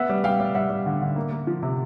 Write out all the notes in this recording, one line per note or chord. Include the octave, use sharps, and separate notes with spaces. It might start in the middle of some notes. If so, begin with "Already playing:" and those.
Already playing: B3 E5 F#5
G3
G3 F5 G5
G3
G3 E5 F#5
G3
D3
D3
A#3
A#3
F3
C3